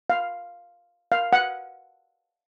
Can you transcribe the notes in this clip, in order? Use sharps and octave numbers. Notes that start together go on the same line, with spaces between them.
F5
F5
F#5